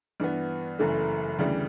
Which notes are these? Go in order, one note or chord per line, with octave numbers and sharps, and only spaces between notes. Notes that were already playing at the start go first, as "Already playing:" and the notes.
G2 E3 B3
F#1 F#2 E3 A3
D2 C#3 E3 G3